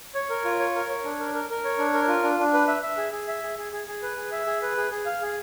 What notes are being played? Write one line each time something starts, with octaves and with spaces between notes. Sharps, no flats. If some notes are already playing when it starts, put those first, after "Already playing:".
C#5
A#4
F4
C#5
A#4
C#5
D4
A#4
A#4
A#4
C#5
D4
A#4
F4
D4
D4
B4
E5
E5
G#4
G#4
E5
G#4
G#4
G#4
G#4
B4
G#4
E5
G#4
B4
G#4
G#4
F5
G#4